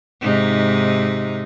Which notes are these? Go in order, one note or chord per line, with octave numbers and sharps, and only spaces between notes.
G#2 C3 D#4